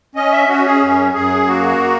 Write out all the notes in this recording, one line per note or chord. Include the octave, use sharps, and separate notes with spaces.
C#4 D#5
E5
C#4 F#4
G#4
F#2
F#2 G#4
A#3 F#4